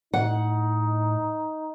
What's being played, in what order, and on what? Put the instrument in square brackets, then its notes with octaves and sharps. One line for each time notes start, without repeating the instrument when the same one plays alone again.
[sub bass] A2 [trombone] D#4 [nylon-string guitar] F#5